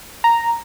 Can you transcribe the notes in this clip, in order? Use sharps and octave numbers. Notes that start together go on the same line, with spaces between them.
A#5